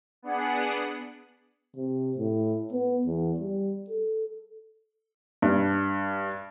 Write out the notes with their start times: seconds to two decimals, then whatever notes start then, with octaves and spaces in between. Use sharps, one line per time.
0.22 B3 D4 G#4 F#5
1.76 C3
2.18 A2
2.72 B3
3.07 E2
3.40 G3
3.90 A4
5.42 G2